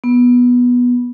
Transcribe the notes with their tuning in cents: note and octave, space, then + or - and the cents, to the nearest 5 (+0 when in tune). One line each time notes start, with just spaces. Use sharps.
B3 -10